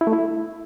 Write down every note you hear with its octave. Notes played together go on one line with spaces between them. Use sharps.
E4
A3
E4